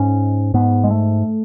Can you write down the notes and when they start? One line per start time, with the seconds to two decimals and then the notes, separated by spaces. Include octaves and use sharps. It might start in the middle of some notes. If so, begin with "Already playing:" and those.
Already playing: G#2 C#4
0.54 G#2 B3
0.84 G#3
0.90 A3